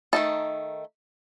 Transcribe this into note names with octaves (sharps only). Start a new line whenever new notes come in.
D#3 A3 D#4 A5